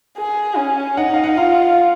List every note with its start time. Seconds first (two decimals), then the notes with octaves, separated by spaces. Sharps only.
0.18 G#4
0.57 C#4
0.97 D#4 F#5
1.14 F5
1.24 F#5
1.37 F4 F5